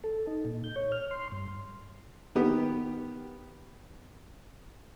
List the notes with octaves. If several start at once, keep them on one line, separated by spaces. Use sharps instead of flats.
A4
D#4
A#2
G6
C#5
F6
C6
G2
D#3 B3 G4